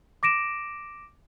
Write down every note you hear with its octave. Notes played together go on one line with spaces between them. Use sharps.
D6 A#6 D7 E7